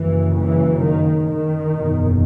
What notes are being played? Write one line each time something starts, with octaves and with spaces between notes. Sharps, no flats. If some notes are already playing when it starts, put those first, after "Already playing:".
Already playing: F#1 F#2 C#3 E3
E3
D#3
D#3
F#1 E2 B2